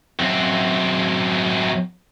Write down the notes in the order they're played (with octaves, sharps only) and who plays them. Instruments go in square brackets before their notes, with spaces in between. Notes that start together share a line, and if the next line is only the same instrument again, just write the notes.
[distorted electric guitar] F#2 C4